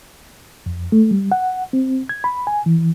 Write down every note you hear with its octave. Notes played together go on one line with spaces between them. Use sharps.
F2
A3
G3
F#5
C4
G#6
B5
G#5
E3